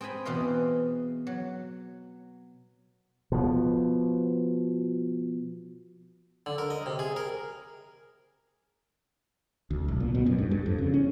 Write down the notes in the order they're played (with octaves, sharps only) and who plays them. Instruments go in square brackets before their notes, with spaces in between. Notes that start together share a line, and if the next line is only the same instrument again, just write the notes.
[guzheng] C4 G#4 G5 G#5 B5
E2 B2 E3 D#5 F5 C6
F#3
[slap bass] B2 F3
[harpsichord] D3
A#4
D#5
C3
G#4
A#4
[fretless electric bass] D2
B1
A#2
B2
F#2
G2
G2
F2
C#3
C#4